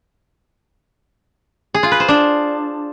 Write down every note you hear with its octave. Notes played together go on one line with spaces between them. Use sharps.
G#4
F4
B4
C5
D4